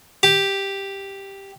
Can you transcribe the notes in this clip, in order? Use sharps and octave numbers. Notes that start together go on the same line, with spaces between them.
G4